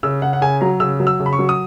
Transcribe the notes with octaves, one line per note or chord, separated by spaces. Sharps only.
C#3 E6
C#3 F#5
F#5
C#3 G#5
F#3 A#5
C#3 E6
F#3
E6
C#3
B5
C#6
F#3
D#6